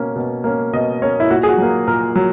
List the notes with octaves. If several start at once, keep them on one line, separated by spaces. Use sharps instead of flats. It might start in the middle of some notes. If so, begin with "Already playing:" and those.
Already playing: B2 A#3 C#4
B2
A#3 C#4
B2 D#5
A#3 C#4 C#5
E4
A#2 F#4
G#4
F#4
F#3 A#3
A#2 A#4
F#3